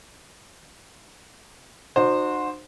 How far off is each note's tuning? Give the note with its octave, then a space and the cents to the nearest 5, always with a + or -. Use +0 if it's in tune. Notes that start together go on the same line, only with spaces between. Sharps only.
D#4 -45 F#4 -25 C5 +0